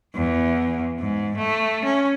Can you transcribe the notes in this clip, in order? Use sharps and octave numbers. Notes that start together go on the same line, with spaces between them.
E2
G#2
A3
C#4